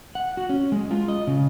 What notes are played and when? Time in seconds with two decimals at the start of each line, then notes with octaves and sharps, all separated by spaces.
0.15 F#5
0.37 F#4
0.49 C#4
0.72 G#3
0.91 F4
1.08 D#5
1.27 C#3